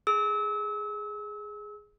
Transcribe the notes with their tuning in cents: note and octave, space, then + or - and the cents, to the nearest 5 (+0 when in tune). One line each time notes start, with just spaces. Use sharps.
G#4 +0 E6 -35